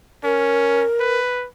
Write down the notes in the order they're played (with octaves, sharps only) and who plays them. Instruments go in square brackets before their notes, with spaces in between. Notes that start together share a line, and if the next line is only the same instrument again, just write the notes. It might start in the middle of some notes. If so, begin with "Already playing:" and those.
[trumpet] C#4 [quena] A#4
[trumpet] B4